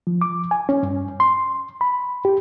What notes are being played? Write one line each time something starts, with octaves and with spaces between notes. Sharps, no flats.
F3
D6
G#5
C#4
G2
C6
B5
G4